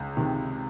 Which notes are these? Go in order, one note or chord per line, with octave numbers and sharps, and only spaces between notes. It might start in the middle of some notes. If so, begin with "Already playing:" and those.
Already playing: C#2
C3 D#3